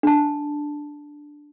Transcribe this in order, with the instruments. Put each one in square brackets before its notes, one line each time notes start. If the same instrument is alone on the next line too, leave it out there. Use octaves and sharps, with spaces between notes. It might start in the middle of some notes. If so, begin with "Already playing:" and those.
[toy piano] D4 A5